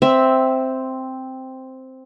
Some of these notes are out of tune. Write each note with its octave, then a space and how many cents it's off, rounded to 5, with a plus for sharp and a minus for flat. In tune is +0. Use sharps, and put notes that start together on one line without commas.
C4 +0 E5 +0